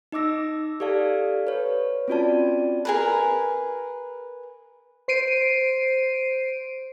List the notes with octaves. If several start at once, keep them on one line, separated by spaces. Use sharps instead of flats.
D#4 D#5 D6 E6 A#6
G4 A4 D5 F5 A5
B4 C#5
C4 C#4 F4 F#4 D5 A5
G#4 A#4 B4
C5 C7 D7 D#7